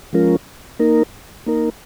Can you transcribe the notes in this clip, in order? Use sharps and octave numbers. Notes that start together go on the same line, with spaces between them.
F3 G#3 C#4 F4 A#4
A#3 D#4 A#4
A#3 D#4 A#4